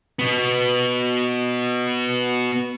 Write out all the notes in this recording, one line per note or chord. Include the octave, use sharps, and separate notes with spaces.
B2 B3